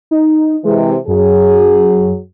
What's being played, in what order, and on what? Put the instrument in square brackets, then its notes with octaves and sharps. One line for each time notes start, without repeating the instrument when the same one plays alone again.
[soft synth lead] D#4
[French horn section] C3 E3 [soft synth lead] G#3
[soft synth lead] F#2 [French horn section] F#3 G#4